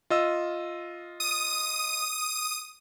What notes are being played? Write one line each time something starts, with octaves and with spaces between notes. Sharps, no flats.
F4 D#5 E6
D#6 D#7